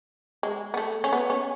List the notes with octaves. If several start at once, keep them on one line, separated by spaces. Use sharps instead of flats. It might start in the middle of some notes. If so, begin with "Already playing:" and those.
G#3
B3
A3
C#4
B3
C#4